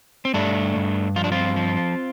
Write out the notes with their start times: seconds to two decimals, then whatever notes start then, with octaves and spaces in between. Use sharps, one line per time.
0.25 C4
0.34 G2 A3 D4
0.76 G2
1.16 F3 F4
1.24 D4
1.32 C4 F4
1.57 F3